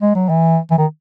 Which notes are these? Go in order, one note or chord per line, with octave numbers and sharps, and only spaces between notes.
G#3
F#3
E3
E3
D#3